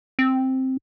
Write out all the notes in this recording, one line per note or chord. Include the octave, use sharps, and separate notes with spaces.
C4